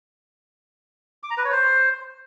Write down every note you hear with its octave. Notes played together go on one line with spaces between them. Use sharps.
D6
A#5
B4
C#5
C5